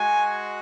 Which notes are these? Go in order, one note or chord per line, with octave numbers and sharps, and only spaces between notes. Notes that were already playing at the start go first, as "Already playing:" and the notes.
Already playing: G#3 F#4 G#5